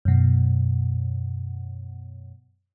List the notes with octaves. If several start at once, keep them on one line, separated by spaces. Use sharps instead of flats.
F#2 B2